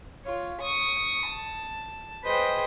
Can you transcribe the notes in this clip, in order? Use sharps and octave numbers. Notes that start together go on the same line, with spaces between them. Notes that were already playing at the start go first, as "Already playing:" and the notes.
F4 C#5
C#6 D#6
A5
G#4 B4 C5 D#5 G5